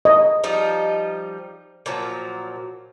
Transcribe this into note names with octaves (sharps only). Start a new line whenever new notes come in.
D#5
F3 G3 D#4
A#2 F3 F#3